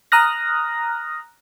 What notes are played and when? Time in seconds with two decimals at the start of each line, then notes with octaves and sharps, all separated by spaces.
0.12 A#5 D#6 F6 F#6 A#6